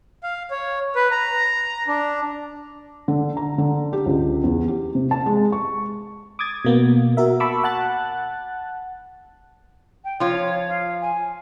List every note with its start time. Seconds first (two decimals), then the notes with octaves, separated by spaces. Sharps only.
0.23 F5
0.51 C#5
0.95 B4
1.11 A#5
1.88 D4
3.08 D3
3.37 A#5
3.58 D3
3.93 G4
4.06 C#2
4.44 E2
4.68 G4
4.95 C3
5.11 A5
5.26 G#3
5.52 C#6
6.39 D6 D#6 G#6 A6
6.65 B2 A#3 B3
7.17 F#4 A#4 E5
7.40 A5 B5 C#6 D6 E6
7.64 F#5 A5 F#6 A6
10.04 G5
10.20 F3 F4 C#5
10.69 F5
11.01 G#5